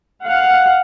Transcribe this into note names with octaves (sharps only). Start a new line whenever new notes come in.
F5 F#5